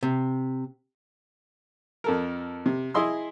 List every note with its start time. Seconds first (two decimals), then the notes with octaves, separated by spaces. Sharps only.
0.03 C3
2.04 F2 A4 A#4
2.66 C3
2.94 E4 G#4 D#5 C6 E6